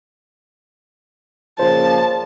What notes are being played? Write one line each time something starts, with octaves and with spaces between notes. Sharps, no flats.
A#2 C#3 F3 C5 A5